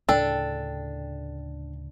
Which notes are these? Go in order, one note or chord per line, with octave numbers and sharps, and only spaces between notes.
D2 A2 C#3 D4 A4 G5